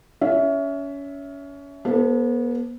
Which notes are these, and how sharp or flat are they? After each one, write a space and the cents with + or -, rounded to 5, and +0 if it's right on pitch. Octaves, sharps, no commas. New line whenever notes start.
C#4 +25 E5 +0
B3 -40 A4 +0 C5 +0